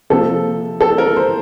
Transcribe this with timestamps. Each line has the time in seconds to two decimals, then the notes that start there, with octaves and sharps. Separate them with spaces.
0.10 C3 F3 A#3 A4
0.81 A4
0.98 A#4
1.17 C5